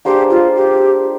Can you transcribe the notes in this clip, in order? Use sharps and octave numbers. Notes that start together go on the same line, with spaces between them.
A#3 D4 G4 G#4 C5
F4
G4